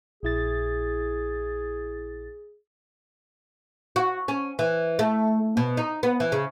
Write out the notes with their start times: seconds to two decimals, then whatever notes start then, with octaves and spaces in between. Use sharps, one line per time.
0.23 A#1 E4 G#4 A6
3.96 F#4
4.28 C#4
4.59 E3
4.99 A3
5.57 B2
5.77 D#4
6.03 B3
6.20 E3
6.32 C#3